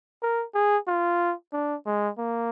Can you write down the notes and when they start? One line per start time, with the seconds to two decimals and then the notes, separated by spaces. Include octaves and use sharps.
0.23 A#4
0.55 G#4
0.88 F4
1.53 D4
1.86 G#3
2.18 A#3